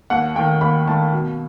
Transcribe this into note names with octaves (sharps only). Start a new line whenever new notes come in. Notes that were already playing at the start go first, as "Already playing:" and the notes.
D#2 F#5
D#3 A3 G5
D#2 B5
D#3 A3 A5
B2